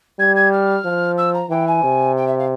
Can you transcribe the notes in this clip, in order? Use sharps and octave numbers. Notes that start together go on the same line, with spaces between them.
G3 G#6
G#6
F6
F3
E6
A#5
E3 G5
G#5
C3
G5
E5
F5